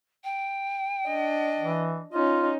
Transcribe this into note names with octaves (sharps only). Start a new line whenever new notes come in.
G5
D4 D#5
E3
C#4 D#4 F4